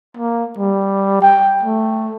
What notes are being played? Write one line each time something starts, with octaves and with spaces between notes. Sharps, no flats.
A#3
G3
G5
A3